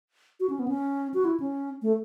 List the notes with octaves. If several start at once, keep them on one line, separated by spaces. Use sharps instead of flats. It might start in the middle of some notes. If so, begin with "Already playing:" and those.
F#4
C#4
B3
C#4
F#4
E4
C#4
A3